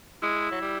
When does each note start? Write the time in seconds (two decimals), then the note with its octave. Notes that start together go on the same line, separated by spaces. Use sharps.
0.22 G#3 E4
0.51 F#3
0.61 G3